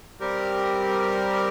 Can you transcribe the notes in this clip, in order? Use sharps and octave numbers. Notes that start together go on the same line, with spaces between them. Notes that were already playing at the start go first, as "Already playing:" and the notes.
G3 C4 G4 A#4